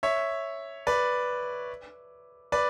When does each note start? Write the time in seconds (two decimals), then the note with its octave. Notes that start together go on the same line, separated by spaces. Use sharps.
0.03 C#5 E5
0.87 B4 D5
2.52 B4 D5